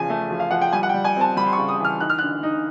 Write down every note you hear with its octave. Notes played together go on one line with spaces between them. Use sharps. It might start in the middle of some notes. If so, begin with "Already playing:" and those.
Already playing: E2 C#3 F3 G#5
A3
F3
F5
F3 F#5
G5
G3 G#5
F#5
G5
G3
G#5
C4 A5
G3 B5
C6
C#6
C#3
D#6
E3 F6
D#4 F#6
F6
D3 F#6
D#4